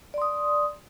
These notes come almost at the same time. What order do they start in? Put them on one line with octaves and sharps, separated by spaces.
D5 C6 D#6